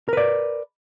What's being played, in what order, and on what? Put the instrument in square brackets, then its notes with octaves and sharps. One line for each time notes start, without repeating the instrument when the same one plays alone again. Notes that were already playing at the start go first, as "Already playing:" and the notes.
[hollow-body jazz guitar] A#4
B4
D5